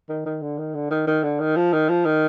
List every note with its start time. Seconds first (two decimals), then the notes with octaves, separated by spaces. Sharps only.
0.09 D#3
0.26 D#3
0.42 D3
0.59 D#3
0.75 D3
0.91 D#3
1.07 D#3
1.24 D3
1.40 D#3
1.57 F3
1.73 D#3
1.89 F3
2.05 D#3